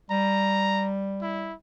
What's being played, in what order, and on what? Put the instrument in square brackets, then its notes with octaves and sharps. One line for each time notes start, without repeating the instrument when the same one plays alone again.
[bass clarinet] G3 [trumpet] A#5
[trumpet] E4